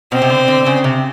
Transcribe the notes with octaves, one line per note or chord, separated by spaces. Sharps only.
B2 C4
C3
D3
D3
C#3
C3